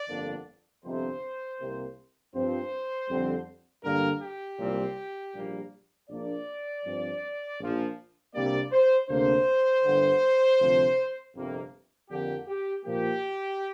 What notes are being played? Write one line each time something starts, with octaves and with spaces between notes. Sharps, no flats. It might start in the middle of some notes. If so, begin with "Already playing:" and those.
Already playing: D5
G1 F2 D3 A#3 D4
G1 F2 C3 C5
C2 C3 A#3
G2 F3 C4 C5
F2 D3 G3 C4
G2 D3 G3 A#3 D4 A#4
G4
C2 A#2 G3 C4
A#1 A#2 G3 A#3
A#1 A#2 A#3 D4 D5
G2 F3 C4
A#1 A#2 F3
C2 C3 G3 A#3 D4 D5
C5
D2 C3 A#3 D4 C5
G1 G2 D3
D2 C3 F3 C4
G1 F2 C3 A#3
F2 D3 A#3 G4
G4
A#2 F3 A#3 G4